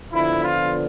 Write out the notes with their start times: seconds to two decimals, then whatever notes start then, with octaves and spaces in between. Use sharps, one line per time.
0.12 D3 F3 B3 E4
0.42 F4